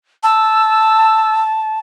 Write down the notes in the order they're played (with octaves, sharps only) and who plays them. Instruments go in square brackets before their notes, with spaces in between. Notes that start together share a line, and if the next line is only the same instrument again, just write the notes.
[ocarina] A5 [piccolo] E6